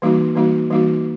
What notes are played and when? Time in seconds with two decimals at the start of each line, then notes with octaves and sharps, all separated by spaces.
0.02 E3 G3 A#3 D#4 F#4
0.36 E3 G3 A#3 D#4 F#4
0.70 E3 G3 A#3 D#4 F#4